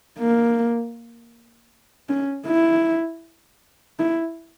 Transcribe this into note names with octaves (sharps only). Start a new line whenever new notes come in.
A#3
C#4
E4
E4